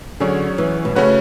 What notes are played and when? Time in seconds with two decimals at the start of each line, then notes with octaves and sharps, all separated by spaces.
0.20 D3 F#3 C#4 G#4 C#5
0.58 E3
0.85 B2
0.95 C#3 A3 C#4 F#4 B4